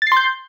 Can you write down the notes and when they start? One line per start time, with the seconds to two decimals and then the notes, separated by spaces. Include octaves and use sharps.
0.02 A6
0.07 C7
0.12 C6
0.17 G6